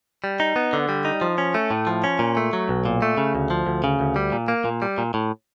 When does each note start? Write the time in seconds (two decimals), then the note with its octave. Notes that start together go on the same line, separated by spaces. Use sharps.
0.24 G3
0.40 D#4
0.56 B3
0.73 D3
0.89 G3
1.05 D#4
1.21 F3
1.38 C#4
1.54 A3
1.71 A2
1.87 F3
2.04 C#4
2.19 A#2
2.37 A3
2.53 F#3
2.69 B1
2.85 A#2
3.02 A3
3.17 C#3
3.35 D2
3.50 F3
3.66 D2
3.84 C#3
4.00 D2
4.16 G3
4.32 A#2
4.48 A#3
4.65 A#2
4.82 G3
4.98 A#2
5.14 A2